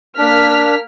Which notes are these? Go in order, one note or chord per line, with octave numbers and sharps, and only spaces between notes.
A#3 D4 F6 B6